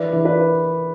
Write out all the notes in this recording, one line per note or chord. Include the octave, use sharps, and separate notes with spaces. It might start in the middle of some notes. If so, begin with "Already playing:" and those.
Already playing: E3 B4 D5
E3
B4 D5